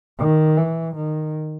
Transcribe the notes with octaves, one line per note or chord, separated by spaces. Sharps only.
D#3
E3
D#3